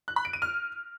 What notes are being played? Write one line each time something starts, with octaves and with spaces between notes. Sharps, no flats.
F#6
B5
D7
D#7
F6